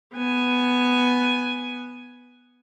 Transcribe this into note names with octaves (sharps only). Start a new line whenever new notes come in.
B3 G#5